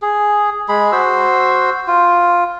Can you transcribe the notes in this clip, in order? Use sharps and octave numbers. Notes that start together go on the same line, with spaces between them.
G#4
G#3 G#4 B5
F#4 C5 E6
F4